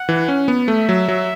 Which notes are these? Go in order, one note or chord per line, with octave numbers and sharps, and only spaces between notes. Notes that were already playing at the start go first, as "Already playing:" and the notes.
Already playing: F#5
E3
C#4
B3
A3 E5
F#3
F#3